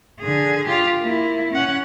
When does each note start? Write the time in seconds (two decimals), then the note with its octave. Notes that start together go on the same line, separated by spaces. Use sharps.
0.20 D3 G#4
0.67 F4 G4
1.00 A#3 E4
1.51 C#4 F#5